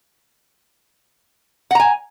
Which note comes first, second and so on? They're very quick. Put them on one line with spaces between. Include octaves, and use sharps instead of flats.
F#5 A#5 G#5